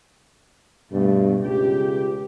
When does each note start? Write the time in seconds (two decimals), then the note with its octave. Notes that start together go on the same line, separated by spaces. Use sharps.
0.92 G2 B2 A3
1.43 C#2 G4